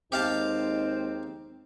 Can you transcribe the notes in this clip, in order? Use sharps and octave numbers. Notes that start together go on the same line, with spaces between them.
D#2 G#3 C4 D#4 G4 F5 A5